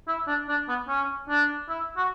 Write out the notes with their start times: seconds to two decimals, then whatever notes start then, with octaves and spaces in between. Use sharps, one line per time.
0.08 E4
0.28 D4
0.49 D4
0.69 B3
0.89 C#4
1.30 D4
1.69 E4
1.97 F#4